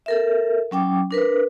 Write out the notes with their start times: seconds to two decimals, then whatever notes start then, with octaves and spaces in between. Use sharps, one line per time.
0.06 A4 A#4 E5
0.71 F#3 C#4 G5 D6
1.11 D4 A#4 B4